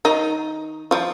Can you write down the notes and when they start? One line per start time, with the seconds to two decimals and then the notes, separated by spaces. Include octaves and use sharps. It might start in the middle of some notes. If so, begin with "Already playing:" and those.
0.05 D#3 D#4
0.91 F3 F4